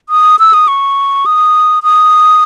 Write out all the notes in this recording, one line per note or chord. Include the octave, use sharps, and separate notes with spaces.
D#6
E6
D#6
C#6
D#6
D#6